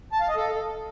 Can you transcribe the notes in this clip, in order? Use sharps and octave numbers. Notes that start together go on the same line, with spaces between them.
A5
F5
D#5
A4